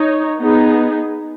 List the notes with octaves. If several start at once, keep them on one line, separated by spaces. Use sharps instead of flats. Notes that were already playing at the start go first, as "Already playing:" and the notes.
Already playing: D#4 C#5
B3 D#4 G#4